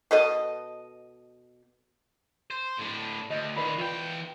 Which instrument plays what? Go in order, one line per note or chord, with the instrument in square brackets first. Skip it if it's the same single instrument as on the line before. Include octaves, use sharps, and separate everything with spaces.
[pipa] B2 A4 D#5
[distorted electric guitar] C5
A2 D4
[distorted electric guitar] D2 [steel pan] D#5
[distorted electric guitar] D#3 F4 [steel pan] B4 D5 B5
[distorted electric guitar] E2 G5 [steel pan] F4 B4